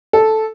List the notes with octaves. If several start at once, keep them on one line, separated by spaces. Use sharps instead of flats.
A4